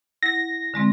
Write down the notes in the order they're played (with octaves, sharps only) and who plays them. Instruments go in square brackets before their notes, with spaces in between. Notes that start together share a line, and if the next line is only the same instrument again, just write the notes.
[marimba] E4 F#5 [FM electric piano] A#6
[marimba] D3 G#3 C4